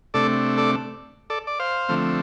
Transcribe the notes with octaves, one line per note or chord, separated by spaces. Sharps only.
C3 A3 D4 A4 D5
A4 D5
A4 D5
D5
C5 F5
D3 F3 A3 C4